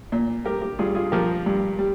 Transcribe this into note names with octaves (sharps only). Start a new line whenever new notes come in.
A#2
G3 G4 A#4
G4
G2 F4 G#4
F4 G#4
F3 G4 A#4
G2
G3